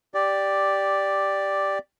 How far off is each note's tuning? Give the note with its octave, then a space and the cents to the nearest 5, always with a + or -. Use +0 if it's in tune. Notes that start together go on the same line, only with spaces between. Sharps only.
G4 +0 D5 +0